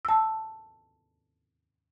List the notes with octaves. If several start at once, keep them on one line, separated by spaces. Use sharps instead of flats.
A5 E6